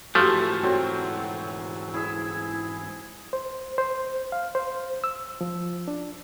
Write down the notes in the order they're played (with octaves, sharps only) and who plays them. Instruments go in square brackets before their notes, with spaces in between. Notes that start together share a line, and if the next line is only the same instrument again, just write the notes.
[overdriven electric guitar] G#2 E3 [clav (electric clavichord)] F3 A3 [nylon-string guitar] F#4 G4 [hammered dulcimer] F5
[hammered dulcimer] A4
[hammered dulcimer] F#3 C4 [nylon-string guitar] F#4
[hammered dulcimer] E4 G#4 E5
[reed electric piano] C5
C5
F5
C5
E6
F3
D4